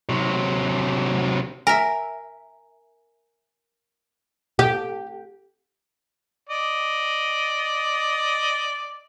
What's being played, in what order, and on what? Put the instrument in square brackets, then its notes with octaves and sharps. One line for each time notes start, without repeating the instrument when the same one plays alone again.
[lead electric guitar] C3 F#3
[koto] A#4 E5 [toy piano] G#5
[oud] G4
[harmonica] D5 D#5